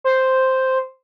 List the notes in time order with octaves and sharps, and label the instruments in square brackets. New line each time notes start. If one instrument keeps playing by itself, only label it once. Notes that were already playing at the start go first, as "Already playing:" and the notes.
[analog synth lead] C5